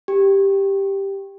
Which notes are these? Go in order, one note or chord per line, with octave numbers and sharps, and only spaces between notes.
G4